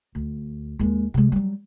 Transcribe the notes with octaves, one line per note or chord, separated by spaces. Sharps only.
D2
D#2 G#3
C3 G#3
F#3 G3